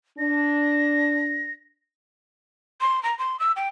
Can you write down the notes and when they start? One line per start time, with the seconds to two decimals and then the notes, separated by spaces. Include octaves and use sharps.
0.18 D4 A#6
2.81 C6
3.03 A#5
3.19 C6
3.40 E6
3.56 G5